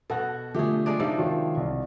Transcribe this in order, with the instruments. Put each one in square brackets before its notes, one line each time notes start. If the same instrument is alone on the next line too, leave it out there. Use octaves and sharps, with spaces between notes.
[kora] B2 F#4 [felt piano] A4 F#5
[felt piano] D3 F3 A3 [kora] G4 G#4
[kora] G#3 D4 D5
[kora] C3 F3 [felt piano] D#4
[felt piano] D#3 F4 C#5
C2